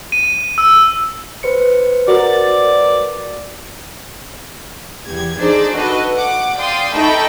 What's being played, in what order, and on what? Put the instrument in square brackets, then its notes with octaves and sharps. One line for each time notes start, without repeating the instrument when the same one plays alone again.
[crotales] D#7
E6
[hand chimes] B4 C5 C#7
[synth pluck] F#4 A#4 A6 [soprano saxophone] D5
[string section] E2 G4 G#6
D4 D#4 G#4 A4 C5 D5
F#4 A4 B4 D#5
F#5 D6
D5 F5 G5 C6 D#6
D#4 A4 E5 G5 B5 C#6